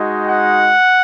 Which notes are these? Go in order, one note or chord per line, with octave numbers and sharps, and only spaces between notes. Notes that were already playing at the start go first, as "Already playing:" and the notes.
Already playing: G#3 D#4 F#4
F#5